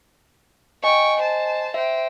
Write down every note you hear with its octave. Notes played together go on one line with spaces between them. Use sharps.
D#5 G5 G#5 C#6
C5 A5
C5 E5 G5